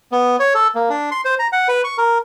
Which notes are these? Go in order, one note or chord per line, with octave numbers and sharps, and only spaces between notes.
B3
C#5
A4
A#3
D4
C6
C5
A#5
F#5
B4
C#6
A#4